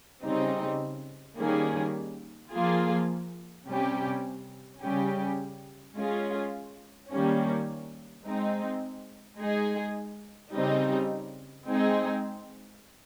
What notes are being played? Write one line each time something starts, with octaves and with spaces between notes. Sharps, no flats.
C#3 G3 C4 D#4
D#3 G3 A#3 C#4 G#4
F3 A#3 F4 G#4
C3 G3 C#4 G4
C#3 G3 C#4 G4
G#3 C#4 F4 G#4
D#3 G3 A#3 C#4
G#3 C4 D#4
G#3 D#4 G#4
C#3 G3 C4 D#4
G#3 C4 D#4 G#4